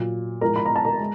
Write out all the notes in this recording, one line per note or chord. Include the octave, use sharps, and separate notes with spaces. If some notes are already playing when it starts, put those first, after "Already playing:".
Already playing: A#2 F#3
A2 F3 G#3 A#4 A#5
B5
A#5
A5
A#4 A#5
G#3